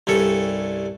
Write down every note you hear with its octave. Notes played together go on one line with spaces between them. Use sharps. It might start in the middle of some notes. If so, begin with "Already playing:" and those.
C2 G2 C#4 A4